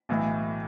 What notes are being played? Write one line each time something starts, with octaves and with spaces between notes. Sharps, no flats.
B1 A2 E3